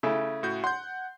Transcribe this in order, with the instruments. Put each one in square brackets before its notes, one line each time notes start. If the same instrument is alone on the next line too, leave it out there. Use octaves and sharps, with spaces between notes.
[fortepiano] C#3 A3 E4
[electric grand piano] A2 F#4 G6
[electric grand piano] F#5 G6 [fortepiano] C6